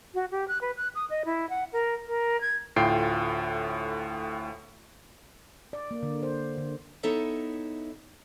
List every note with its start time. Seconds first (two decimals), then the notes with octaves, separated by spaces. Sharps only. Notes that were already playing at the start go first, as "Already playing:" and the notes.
0.14 F#4
0.31 G4
0.48 F#6
0.61 B4
0.77 F#6
0.95 D#6
1.10 D#5
1.25 E4
1.50 F#5
1.73 A#4
2.07 A#4
2.41 G#6
2.76 D2 A2 F4 G5 C7
5.73 D5
5.91 A#3
6.03 D3
6.23 C5
6.58 D3
7.03 B3 D#4 E4 A4 C#5 E5